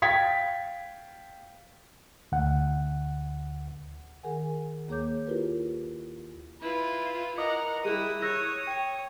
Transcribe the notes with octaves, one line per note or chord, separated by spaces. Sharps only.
F5 G5 G#6 A6 B6
D2 F#5
D#3 G#4 A#4 F#5 G#5
D#2 A#3 G#4 C#5 D6 G6
E4 F4 G4 A#4 B4
E4 F4 B4
A#4 D#5 F#5 D6 D#6
G3 E4 G4 G#4 D#6 F#6
C#5 E6 F#6 A#6
C#5 G5